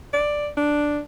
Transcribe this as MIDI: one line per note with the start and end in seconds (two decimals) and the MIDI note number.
0.13 0.49 74
0.57 1.00 62